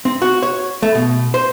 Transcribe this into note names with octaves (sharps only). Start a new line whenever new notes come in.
C4
F#4
C#5
A3
B2
C5